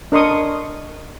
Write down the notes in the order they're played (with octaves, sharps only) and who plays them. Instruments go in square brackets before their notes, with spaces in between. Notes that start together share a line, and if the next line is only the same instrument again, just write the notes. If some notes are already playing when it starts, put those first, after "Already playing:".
[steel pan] D4 A#4 D#5 C6 C#6 D#6